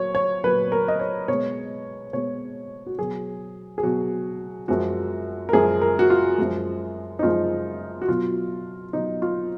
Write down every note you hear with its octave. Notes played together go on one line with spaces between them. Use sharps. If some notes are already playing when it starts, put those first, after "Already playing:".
Already playing: A#2 F#3 C#5
C#5
A#2 F#3 B4
A#4
D#5
C#5
B2 G#3 C#5
B2 G#3 C#5
F#4
B2 F#3 G#4
G#4
B2 F#3 F#4
F#2 F3 G#3 F#4
A#4
F#2 F3 G#3 G#4
A#4
F#4
F4
F#2 F3 G#3
D#4
F#2 F3 G#3 F4
F#4
B2 F#3 F4
B2 F#3 D#4
F4